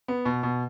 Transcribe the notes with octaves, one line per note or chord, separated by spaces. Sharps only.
B3
B2
B2